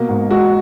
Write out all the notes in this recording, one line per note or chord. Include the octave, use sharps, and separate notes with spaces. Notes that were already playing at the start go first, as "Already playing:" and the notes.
Already playing: B2 A#3
G#2
G#3 F#4